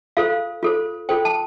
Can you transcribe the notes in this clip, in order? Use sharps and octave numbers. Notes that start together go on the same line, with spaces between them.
F4 A4 C5 F5
F4 A4 C5
F4 A4 C5 G5
A5